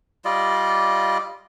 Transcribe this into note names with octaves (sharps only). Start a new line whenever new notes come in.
G3 F4 D5 D#5